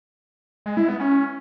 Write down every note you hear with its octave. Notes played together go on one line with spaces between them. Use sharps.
G#3
E4
B3
C#4